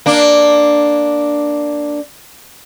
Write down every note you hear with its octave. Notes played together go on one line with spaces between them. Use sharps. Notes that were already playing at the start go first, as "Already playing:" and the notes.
A#3 D4